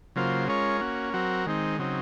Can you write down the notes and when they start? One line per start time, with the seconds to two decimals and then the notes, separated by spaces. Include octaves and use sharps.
0.16 C#3 F#3 A#3 F4 C5
0.48 G#3 C#4 F4 A#4 C#5
0.81 A#3 C#4 F#4
1.14 F#3 C4 F#4 A#4
1.47 D#3 G#3 C4 D#4
1.79 C#3 F#3 C4 D#4